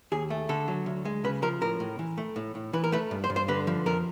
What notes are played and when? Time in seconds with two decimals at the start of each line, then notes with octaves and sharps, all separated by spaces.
0.12 D#2 G#4
0.30 A3
0.49 D3 A4
0.68 F#3
0.86 D2
1.05 G#3
1.24 C#3 B4
1.42 F3 A#4
1.61 A2 A#4
1.80 A2
1.99 E3
2.18 A3
2.36 A2
2.55 A2
2.73 E3 B4
2.84 A#4
2.92 A3 B4
3.11 G2
3.24 C5
3.30 G2
3.36 C5
3.48 D3 B4
3.67 F3
3.86 F2 A#4